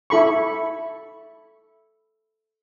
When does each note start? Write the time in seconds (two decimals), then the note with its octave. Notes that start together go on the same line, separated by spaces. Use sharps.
0.10 E4 A4 B5 C#6